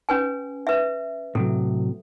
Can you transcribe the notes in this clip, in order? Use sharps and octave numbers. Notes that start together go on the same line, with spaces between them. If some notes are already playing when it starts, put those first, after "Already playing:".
C#4 B4 G#5
B4 E5
A2 C3 F#3 A4